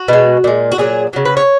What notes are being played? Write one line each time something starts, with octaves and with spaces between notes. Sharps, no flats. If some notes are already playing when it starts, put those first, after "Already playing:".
Already playing: F#4
B2 G#3
A#2 G#3
F#4
A#2 F#3 G#4
C#3 F#3
B4
C#5